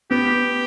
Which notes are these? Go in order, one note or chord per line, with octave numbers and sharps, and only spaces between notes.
B3 G4